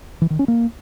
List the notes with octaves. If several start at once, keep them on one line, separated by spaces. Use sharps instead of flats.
E3
D#3
C#4
A#3